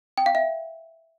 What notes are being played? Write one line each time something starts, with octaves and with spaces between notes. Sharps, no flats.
G5
F5
E5